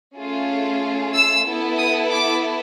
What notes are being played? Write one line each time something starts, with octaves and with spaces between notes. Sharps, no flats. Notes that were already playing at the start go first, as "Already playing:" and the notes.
A3 C#4 F4 G#4
E6
B3 E4 A4
D#6
D6